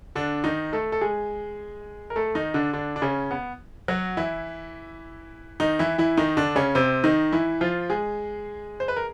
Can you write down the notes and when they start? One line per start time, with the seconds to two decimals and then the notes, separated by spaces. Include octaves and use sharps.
0.15 D3 D4
0.44 D#3 D#4
0.73 A3 A4
0.92 A4
1.01 G#3 G#4
2.10 A#4
2.16 A3 A4
2.35 D#3 D#4
2.54 D3 D4
2.73 D3 D4
2.96 D4
3.02 C#3 C#4
3.31 B3
3.88 F#3 F#4
4.17 E3 E4
5.60 D#3 D#4
5.79 E3 E4
5.98 E3 E4
6.17 D#3 D#4
6.37 D3 D4
6.56 C#3 C#4
6.75 C3 C4
7.04 D#3 D#4
7.32 E3 E4
7.61 F3 F4
7.90 G#3 G#4
8.80 C5
8.88 B4
8.96 A#4